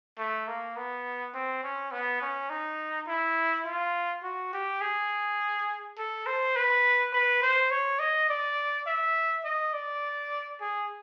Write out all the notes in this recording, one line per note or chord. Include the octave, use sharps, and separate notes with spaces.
A3
A#3
B3
C4
C#4
B3
C#4
D#4
E4
F4
F#4
G4
G#4
A4
C5
B4
B4
C5
C#5
D#5
D5
E5
D#5
D5
G#4